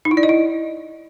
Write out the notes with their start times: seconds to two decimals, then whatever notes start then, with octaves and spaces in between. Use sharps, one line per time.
0.05 D#4
0.11 E4
0.17 D5
0.23 D#5
0.29 E4